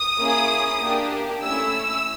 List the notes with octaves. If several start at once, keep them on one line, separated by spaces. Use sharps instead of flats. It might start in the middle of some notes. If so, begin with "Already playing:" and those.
Already playing: D#6
A#3 C#4 E4 G#4
A#3 D4 G4
A3 C#4 E4 E6